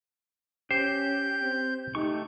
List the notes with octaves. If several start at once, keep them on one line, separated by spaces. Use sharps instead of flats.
C#4 G4 C5 G6
C4
A3 D#4 G4 C#6